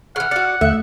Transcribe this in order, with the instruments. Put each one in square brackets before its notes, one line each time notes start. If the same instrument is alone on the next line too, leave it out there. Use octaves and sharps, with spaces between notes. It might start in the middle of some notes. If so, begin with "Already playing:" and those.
[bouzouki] C#3 E3 [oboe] F#5 [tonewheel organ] F6
[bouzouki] F#4 D5 [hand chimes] C#7
[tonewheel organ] D#2 D3 F#6 [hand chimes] A3 [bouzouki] E5